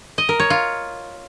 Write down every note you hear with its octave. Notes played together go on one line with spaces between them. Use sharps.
D#5
A#4
C#5
F4